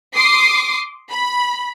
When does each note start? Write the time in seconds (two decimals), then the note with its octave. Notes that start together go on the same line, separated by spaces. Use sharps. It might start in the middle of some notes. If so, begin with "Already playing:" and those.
0.15 C6 D6 D#6 C7
1.11 B5